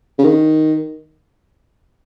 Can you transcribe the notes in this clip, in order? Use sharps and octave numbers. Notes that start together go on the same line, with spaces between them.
C#3
D#3